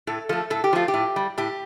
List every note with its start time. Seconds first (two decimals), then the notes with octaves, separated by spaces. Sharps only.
0.07 A2 A4
0.29 F3 A3 A4
0.50 A2 A4
0.64 G4
0.73 F3 A3 F4
0.88 G4
0.94 A2
1.16 G3
1.38 A2 G4